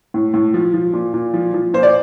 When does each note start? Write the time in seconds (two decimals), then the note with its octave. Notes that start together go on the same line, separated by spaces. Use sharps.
0.14 A2
0.34 A2
0.54 F3
0.74 F3
0.94 A#2
1.14 A#2
1.34 F3
1.54 F3
1.74 A#2 C5
1.83 D5